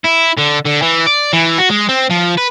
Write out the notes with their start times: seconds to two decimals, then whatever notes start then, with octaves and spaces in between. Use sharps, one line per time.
0.04 E4
0.37 D3
0.65 D3
0.82 E3
1.06 D5
1.33 E3
1.58 F#4
1.70 G#3
1.89 C4
2.10 F3
2.38 B4